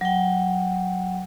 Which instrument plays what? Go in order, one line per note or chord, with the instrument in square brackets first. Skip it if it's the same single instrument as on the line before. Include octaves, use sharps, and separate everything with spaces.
[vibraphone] F#3 G5